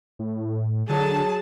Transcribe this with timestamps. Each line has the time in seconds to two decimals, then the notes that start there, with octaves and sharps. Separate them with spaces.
0.19 A2
0.89 D3 F#3 G#4 A5